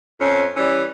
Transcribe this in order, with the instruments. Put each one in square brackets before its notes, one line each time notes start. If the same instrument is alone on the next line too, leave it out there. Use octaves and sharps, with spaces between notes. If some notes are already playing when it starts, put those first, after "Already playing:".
[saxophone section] F2 C#4
E3 G3 C#4